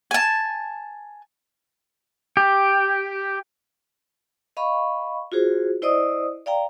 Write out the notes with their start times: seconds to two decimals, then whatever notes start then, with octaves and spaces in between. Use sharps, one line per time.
0.11 G#5 A5
2.37 G4
4.57 D#5 F5 B5 C#6
5.32 F4 F#4 G#4 C5
5.82 E4 C5 D5 D#5 D#6
6.46 D5 F5 G5 A#5